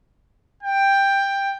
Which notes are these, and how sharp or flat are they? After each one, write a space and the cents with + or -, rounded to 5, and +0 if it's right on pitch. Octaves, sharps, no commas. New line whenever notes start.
G5 +10